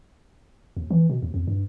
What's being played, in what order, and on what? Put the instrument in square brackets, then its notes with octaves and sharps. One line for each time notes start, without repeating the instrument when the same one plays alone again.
[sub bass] D#2
E3
B2
D#2
F2
G2